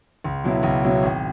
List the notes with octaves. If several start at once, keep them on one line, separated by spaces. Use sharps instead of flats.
C#2
B2 F#3 E4
C#2
B2 F#3 E4
G#1